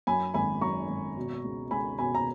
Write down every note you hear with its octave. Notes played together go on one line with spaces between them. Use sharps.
F#2 G#5 B5
G#1 G#5 B5
F#2 A#5 C#6
G#1
B2
C#2
C#2 G#5 B5
B2 G#5 B5
A#5